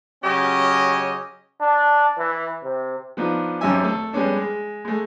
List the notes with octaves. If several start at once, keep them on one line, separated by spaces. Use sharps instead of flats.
C#3 F#3 C#4 G4 C#5 D#5
D4
E3
C3
F3 B3 D4 D#4
G#1 F#2 C#4 G4 E5 G#5
A3 A4
G3 G#3 B3 C#4 D4
G#3
G#3 A3